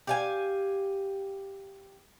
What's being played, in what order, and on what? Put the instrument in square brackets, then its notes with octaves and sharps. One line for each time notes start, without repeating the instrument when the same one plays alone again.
[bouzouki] G4 F5 G#5